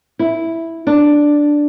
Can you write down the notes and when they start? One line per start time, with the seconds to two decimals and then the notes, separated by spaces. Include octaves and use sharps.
0.19 E4
0.87 D4